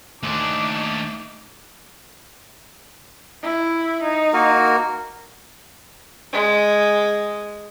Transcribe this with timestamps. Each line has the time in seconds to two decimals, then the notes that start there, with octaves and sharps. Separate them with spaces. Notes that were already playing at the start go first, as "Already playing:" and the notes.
0.23 D#2 A3 D4 D#4 C6 D6
3.42 E4
4.03 D#4
4.33 A#3 F#4 A#4
6.33 G#3 G#4